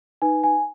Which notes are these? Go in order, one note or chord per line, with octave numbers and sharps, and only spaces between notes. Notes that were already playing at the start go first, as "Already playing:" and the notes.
D#4 B4 G#5
G#5